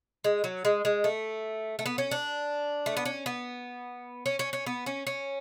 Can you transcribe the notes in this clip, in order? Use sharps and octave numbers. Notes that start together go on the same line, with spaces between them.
G#3
F#3
G#3
G#3
A3
A3
B3
C#4
D4
A3
B3
C#4
B3
C#4
C#4
C#4
B3
C#4
C#4